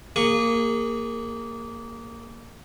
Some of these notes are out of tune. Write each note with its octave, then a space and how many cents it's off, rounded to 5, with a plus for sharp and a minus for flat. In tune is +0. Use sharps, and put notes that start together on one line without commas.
A#3 -10 G#4 -25 C#6 +0